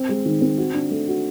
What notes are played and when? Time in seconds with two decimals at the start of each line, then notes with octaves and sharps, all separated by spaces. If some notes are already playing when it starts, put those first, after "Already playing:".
Already playing: C4
0.09 G#3
0.26 D#3
0.42 C4
0.58 F#4
0.74 D4
0.91 A3
1.08 F#4